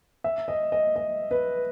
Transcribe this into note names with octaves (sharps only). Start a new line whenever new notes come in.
E5
D#5
D#5
D#5
B4